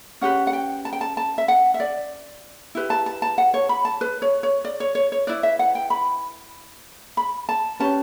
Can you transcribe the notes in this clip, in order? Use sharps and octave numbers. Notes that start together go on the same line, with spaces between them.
C#4 G4 B4 F#5
F#5
G5
A5
G5
A5
A5
E5
F#5
E5
D5
E4 G4 B4
A5
A5
A5
F#5
C#5
B5
A5
B4
C#5
C#5
D5
C#5
C#5
C#5
E4 B4 D5
E5
F#5
G5
B5
B5
A5
C#4 G4 B4 A5